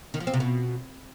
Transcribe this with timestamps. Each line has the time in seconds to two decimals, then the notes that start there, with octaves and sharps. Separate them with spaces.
0.14 D#3
0.20 F3
0.27 C4
0.34 C3
0.40 B2